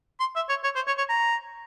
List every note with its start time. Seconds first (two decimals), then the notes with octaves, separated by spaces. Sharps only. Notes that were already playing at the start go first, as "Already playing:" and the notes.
0.20 C6
0.35 E5
0.49 C#5
0.64 C#5
0.75 C5
0.87 C#5
0.98 C#5
1.09 A#5